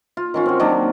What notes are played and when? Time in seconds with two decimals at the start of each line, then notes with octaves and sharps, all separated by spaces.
0.17 F4
0.34 D#3 C#4 F4
0.46 C4 F#4
0.60 D#3 F#3 A#3 D4